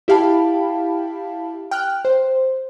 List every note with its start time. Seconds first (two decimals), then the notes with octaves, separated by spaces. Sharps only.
0.08 E4 G4 F5 G5 A5 B5
1.71 G5 F6 F#6
2.05 C5